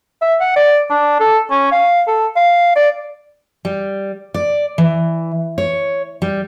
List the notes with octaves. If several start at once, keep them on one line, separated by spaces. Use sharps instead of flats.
E5
F#5
D5
D4
A4
C#4
F5
A4
F5
D5
G3
D5
E3
C#5
G3